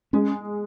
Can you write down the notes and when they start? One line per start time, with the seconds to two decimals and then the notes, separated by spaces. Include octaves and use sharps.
0.13 G#3 C#4